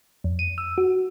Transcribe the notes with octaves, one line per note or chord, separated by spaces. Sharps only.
F2
D#7
E6
F#4